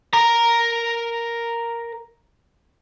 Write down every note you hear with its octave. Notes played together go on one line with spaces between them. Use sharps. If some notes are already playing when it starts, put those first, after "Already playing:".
A#4 A#5